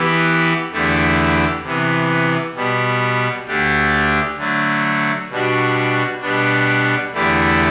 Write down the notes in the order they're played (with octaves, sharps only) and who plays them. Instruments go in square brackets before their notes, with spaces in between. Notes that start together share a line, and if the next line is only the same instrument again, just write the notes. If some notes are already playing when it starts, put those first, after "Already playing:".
Already playing: [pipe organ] E3 B3 E4 G4
E2 D3 A3 E4 G4
C3 E3 B3
B2 G3 B3
D2 D3 A3 D4 G4
D3 F#3 A3
B2 G3 D4 F#4
B2 G3 B3 D4
E2 D3 A3 E4 G4